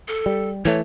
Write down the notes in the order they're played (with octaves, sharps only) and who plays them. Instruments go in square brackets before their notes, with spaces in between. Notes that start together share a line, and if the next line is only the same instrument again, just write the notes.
[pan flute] A4
[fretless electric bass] G3
[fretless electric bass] E3 A3 [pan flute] C#5